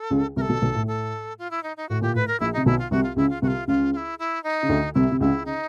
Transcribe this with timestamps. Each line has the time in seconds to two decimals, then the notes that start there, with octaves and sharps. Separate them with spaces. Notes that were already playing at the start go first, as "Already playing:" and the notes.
Already playing: A4
0.11 C#2 C#3
0.36 C2 C3 A#4
0.41 A4
0.49 B1 B2
0.62 B1 B2
0.75 A2
0.87 A4
1.39 F4
1.51 E4
1.63 D#4
1.77 D#4
1.89 A2 F#4
2.01 A#2 G4
2.15 A2 B4
2.28 A#4
2.40 A#1 A#2 E4
2.53 C3 D#4
2.66 B1 B2 E4
2.79 F4
2.91 C2 C3 F#4
3.03 F4
3.16 C#2 C#3 E4
3.30 F4
3.42 C2 C3 F#4
3.48 F4
3.68 C#2 C#3 F4
3.93 F4
3.97 E4
4.19 E4
4.44 D#4
4.63 C#3
4.69 D2 D3
4.94 C2 C3 E4
5.12 C3
5.20 C#2 C#3 E4
5.46 C#3 D#4